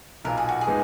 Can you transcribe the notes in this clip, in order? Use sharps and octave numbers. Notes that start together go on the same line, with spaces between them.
B1 A#2 A#3 A#4
G#4
F#4
G#4
A#2 G#3 B3 D#4